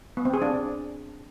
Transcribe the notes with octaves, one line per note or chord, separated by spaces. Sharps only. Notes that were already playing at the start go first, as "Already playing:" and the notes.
B3
C4
G#4
D4